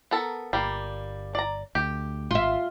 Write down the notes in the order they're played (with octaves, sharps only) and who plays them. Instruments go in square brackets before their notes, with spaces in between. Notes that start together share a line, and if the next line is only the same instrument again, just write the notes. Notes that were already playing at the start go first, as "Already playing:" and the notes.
[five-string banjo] B3 A4 A#4
[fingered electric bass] G1 [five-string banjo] G3 A#3
[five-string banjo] D5 A#5
[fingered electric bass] D2 [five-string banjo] G4
[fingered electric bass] G#1 [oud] F4 E5